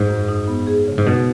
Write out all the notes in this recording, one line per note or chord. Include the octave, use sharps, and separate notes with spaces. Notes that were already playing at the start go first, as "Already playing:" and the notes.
Already playing: G#2
F#2
D#4
B3
G#4
C#3
G#2
B2 D#4